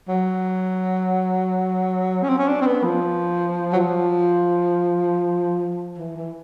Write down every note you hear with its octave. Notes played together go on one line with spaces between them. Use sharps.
F#3
C#4
C4
C#4
D4
C4
B3
F3
F#3
F3
E3
E3